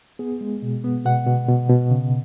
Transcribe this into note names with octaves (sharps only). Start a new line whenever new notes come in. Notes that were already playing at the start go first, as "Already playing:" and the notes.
B3 G#4
G#3
B2
B3
B2 F#5
B2
B2
B2
C#3